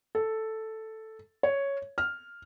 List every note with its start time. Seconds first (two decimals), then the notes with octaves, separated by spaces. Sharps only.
0.15 A4
1.43 C#5
1.98 F6